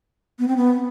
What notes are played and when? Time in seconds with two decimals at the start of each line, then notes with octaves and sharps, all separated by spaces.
0.39 B3
0.48 C4
0.57 B3